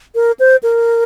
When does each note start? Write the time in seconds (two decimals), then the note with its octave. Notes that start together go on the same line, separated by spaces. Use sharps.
0.15 A#4
0.39 C5
0.63 A#4